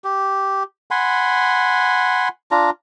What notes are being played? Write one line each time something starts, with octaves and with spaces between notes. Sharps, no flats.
G4
F#5 G#5 B5 C6
D4 F4 A#5